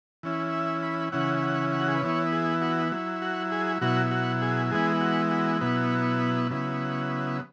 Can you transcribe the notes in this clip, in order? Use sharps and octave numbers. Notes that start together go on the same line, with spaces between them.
E3 C#4 E4
E5
B5
C#3 E3 C#4 E4 F#5
F#5
F#5
F#4
G#4
B4
E3 B3 E4 C#5
G#4
F#4
F#3 E4
F#4
G#4
B2 F#3 E4 F#4
F#4
G#4
E3 G#3 B3 E4 G#4
F#4
F#4
B2 F#3 B3 E4
C#3 F#3 B3 E4